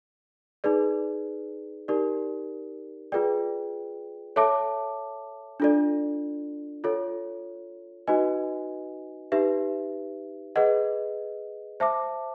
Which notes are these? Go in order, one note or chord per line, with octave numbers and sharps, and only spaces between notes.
D#4 G#4 B4 D5
D#4 G4 A#4 D5
F4 G#4 B4 D5 G5
A4 C#5 E5 A5 D6
D4 F4 A4 D5
F4 A4 C#5
D#4 F#4 B4 D#5 G#5
D#4 G4 B4 E5
G#4 B4 D#5 F#5
C5 E5 A5 D6